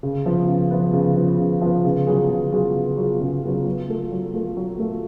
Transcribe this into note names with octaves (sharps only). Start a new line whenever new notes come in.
C#3
F3 B3
C#3
F3 B3
C#3
F3 B3
C#3
F3 B3
C#3
F#3 B3 F4 G#4
C#3
F#3 B3 F4 G#4
C#3
F#3 B3 F4 G#4
C#3
F#3 B3 F4 G#4
F#3
A3 F4 A4
F#3
A3 F4 A4
F#3
A3 F4 A4